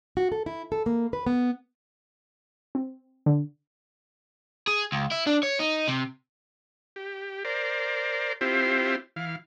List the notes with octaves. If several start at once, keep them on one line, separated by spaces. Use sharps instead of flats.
F#4
A4
E4
A4
A#3
B4
B3
C4
D3
G#4
C#2
E4
D4
C#5
D#4
C3
G4
A#4 C5 D5
C4 E4 F4 G4 C5
E3 F5